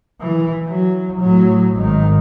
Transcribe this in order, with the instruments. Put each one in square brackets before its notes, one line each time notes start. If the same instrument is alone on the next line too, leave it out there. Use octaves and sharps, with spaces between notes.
[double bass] E3
F#3
A2 F#3
G#1 D#3